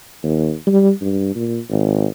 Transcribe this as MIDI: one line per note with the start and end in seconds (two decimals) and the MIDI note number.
0.24 0.53 39
0.67 0.91 55
1.01 1.31 43
1.35 1.58 46
1.70 2.06 32